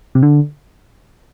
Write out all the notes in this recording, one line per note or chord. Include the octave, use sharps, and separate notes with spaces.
C3
D3